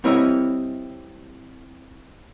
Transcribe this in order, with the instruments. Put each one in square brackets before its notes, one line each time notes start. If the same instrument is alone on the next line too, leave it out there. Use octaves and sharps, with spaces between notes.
[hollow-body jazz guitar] G3 C4 E4 A#4 C#5 D#5